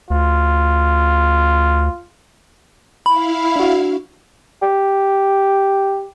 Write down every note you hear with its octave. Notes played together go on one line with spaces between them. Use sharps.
D2 F4
E4 F5 B5
D4 F#4
G4